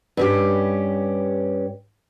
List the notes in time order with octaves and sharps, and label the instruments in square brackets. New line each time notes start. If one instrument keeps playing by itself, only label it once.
[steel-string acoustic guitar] G2 C#4 G4